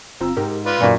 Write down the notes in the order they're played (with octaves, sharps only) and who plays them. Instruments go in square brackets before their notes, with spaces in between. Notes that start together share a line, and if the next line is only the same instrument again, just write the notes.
[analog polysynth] G1 C4 F4 [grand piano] A#5 E6
[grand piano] G#2 [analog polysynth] G4 A#4
[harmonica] F4 B4 [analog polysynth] D5
[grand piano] F#2 D#3 [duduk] A#2 [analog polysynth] C#6